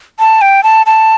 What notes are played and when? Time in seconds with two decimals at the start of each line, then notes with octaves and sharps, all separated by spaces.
0.19 A5
0.41 G5
0.63 A5
0.86 A5